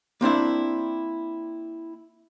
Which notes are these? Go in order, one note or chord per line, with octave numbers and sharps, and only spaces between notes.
A#3 C4 D4 E4